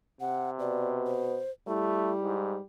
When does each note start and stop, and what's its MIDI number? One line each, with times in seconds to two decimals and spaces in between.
0.20 1.30 48
0.20 0.50 78
0.59 1.39 47
0.59 0.89 74
1.07 1.51 72
1.67 2.62 55
1.67 2.11 57
1.67 2.34 64
2.22 2.57 44